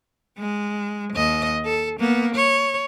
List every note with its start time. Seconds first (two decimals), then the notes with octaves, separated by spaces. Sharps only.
0.38 G#3
1.13 D#2 D#5
1.65 A4
1.99 A#3 B3
2.35 C#5